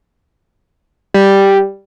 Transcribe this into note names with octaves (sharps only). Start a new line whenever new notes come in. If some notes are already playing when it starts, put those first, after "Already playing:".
G3